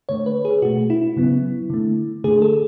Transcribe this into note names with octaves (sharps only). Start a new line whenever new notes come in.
D3 A3 C#5
B4
G#4
B2 A3 F#4
E4
C#3 F#3 B3
D3 A3
D3 A3 G#4
A4